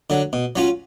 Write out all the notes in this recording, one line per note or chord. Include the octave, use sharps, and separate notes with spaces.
D3 F#3
B2
F#3 C#4 F4